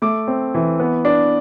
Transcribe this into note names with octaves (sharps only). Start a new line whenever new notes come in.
A3 D6
C4
E3
B3
D4